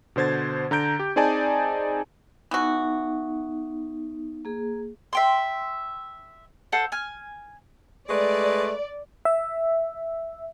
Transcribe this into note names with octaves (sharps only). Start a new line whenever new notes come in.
B2 D3 C5 G#6 A6
D3 A#5 G6 D7
G4
C4 D#4 G#4 D5 G#5 A5
E3 B3 D#4 F#4
A#3 G#4
E5 G5 C6
A4 C5 F#5
G#5 F6
G#3 A3 B4 D5
E5